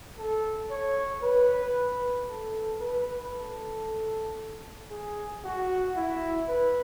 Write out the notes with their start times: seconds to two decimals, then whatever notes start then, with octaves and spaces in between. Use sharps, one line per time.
0.18 A4
0.70 C#5
1.23 B4
2.29 A4
2.80 B4
3.33 A4
4.90 G#4
5.44 F#4
5.96 E4
6.48 B4